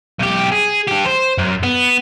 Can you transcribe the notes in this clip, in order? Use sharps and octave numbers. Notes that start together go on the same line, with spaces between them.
B1 G4
G#4
D4 G4
C5
F#2
B3